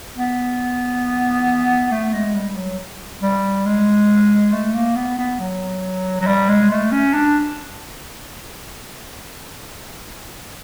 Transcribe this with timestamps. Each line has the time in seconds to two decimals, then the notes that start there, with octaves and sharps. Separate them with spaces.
0.17 B3
1.91 A3
2.13 G#3
2.35 G3
2.56 F#3
3.22 G3
3.66 G#3
4.53 A3
4.74 A#3
4.96 B3
5.18 B3
5.39 F#3
6.21 F#3
6.27 G3
6.49 G#3
6.70 A3
6.92 C#4
7.14 D4